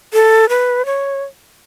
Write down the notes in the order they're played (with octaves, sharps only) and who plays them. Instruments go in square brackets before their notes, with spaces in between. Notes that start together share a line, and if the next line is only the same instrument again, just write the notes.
[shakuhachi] A4
B4
C#5